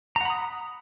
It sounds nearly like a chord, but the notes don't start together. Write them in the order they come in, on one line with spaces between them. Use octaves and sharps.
A#5 F#5 B5 D#6